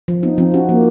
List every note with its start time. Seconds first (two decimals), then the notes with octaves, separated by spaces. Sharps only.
0.08 F3
0.23 B3 D#4
0.38 F3 C4
0.53 C#4 F#4
0.69 F3 A#3